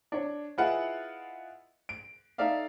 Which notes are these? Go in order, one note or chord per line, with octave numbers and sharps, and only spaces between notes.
D4 C#5
E4 F4 G#4 B4 D#5 F#5
D7
D#4 A4 D5 E5 F5